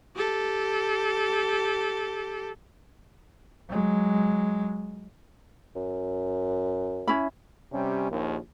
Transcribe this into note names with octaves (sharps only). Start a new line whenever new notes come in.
G4 A4
F#3 G#3
F#2
C#4 E4 B5
C3 G3 C#4
A#1 D#2